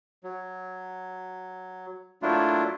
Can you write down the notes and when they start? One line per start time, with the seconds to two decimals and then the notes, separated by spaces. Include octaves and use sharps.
0.24 F#3
2.22 F#3 A3 A#3 D4 E4 F4